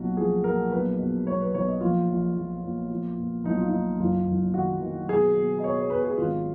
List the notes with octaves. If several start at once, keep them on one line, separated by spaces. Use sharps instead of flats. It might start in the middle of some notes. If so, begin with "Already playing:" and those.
Already playing: B1 A#2 F#4
F3 G#4
A#2 A#4
B1 B4
B2
B1 C#5
B4
B1 C#5
D#5
A#1 F4
A#1
A#1
A#2
F3
A#2
B1 D#4
F4
A#2 D#4
F#1 F4
F#1
D#3 F#4
D#3
B2 G#4
B2
D#5
B2 C#5
C#5
B2 B4
G#4
G#1 F4